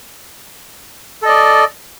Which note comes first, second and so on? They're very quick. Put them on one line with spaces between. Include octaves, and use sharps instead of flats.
A4 D#5 D5